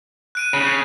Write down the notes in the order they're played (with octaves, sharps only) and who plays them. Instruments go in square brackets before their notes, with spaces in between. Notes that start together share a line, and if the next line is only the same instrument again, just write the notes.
[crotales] F#6 D7 D#7
[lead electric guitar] C#3